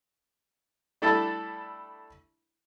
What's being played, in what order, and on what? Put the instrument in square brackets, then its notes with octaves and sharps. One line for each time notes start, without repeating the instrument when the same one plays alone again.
[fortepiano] G3 A3 D4 E4 A4